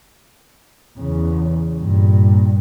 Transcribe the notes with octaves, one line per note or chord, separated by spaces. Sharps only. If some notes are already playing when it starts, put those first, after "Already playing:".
E2 C#3
G2 A#2